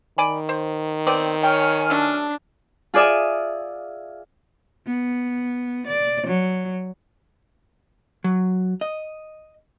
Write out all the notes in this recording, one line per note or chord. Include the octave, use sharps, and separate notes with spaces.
D#3 D5 G#5 B5
C5
B3 C4 D5
C#5 G5 G#5 F6
F#3 A3 D4 A4
F4 G#4 D5 E5 D#6
B3
D5
F#3
F#3
D#5